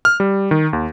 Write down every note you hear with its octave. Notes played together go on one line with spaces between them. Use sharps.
F6
G3
D#3
D#2